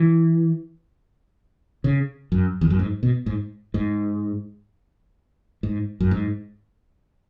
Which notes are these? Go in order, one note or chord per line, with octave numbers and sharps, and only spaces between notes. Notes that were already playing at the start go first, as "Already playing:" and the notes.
Already playing: E3
C#3
F#2
E2
F#2
G#2
B2
G#2
G#2
G#2
F#2
G#2